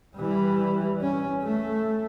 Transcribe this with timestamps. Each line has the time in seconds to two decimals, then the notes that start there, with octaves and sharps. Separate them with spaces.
0.16 E3 G3
1.01 C#4
1.44 A3